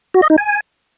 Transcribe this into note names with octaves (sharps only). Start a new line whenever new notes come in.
F#4
D#5
D#4
G#5